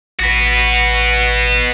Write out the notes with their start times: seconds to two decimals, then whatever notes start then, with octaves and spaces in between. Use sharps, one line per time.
0.20 A1 F#4 B4